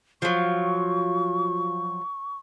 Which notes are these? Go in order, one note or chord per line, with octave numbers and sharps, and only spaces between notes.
F3 F#3 C#6